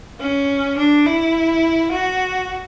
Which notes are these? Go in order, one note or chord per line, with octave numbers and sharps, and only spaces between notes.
C#4
D4
E4
F#4